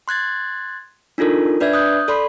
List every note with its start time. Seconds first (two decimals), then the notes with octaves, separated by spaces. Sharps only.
0.08 C6 F#6 G#6 A6
1.18 D4 D#4 F4 A4 A#4
1.60 D4 B4 D5 E5 G#6
1.73 D#6 F#6 G6
2.08 A4 D5 B5 C6